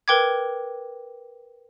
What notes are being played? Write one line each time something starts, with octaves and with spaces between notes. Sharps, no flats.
A#4 B4 G5 D6 G#6